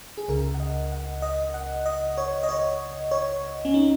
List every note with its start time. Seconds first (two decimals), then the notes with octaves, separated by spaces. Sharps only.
0.18 G#4
0.28 C#2 C#3 A#4
0.54 F#5
0.60 D#5
0.92 F#5
1.22 D#5
1.54 F#5
1.86 D#5
2.18 C#5
2.43 D#5
2.49 C#5
3.11 C#5
3.65 C#4
3.74 D#4